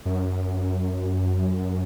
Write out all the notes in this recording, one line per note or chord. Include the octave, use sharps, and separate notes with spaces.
F#2